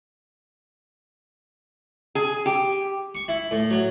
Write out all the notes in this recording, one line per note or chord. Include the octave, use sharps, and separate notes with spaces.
G#4
G4
C#6
E4
A2
F#3